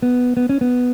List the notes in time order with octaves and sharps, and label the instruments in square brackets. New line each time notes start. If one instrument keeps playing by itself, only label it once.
[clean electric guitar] B3
B3
C#4
B3